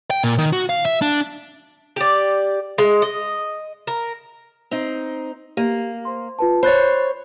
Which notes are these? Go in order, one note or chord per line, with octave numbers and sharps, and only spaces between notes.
G5
A#2
D#3
F#4
F5
E5
D4
G4 D5
G#3
D#5
A#4
C4 D#4
A#3 G4
C5 C6
F4 B4 A5
C5 C#5 B5 F#6 A6